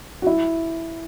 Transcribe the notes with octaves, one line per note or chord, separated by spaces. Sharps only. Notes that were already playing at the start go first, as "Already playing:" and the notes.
F#4
E4